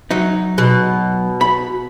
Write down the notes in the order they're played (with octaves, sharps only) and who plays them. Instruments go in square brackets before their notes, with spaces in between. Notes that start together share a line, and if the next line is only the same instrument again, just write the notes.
[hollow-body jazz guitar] F#3 D#4
[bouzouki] B2
[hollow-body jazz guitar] B5